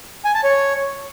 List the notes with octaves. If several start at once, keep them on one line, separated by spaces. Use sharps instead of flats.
G#5
A5
C#5